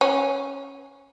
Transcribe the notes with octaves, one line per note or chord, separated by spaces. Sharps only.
C#4